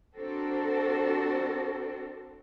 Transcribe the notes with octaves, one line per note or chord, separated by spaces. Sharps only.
C4 D4 F#4 A4 A#4